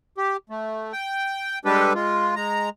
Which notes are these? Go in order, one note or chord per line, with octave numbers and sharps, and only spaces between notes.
G4
A3
G5
G3 G#3 D4 G4 A4 B4
G#3 F4
G#3 A#5